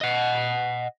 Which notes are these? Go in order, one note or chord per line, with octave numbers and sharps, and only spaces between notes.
D#5 F#5